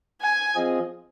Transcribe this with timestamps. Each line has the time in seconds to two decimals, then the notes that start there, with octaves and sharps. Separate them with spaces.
0.22 G#5
0.55 F3 C4 F4 G#4 D#5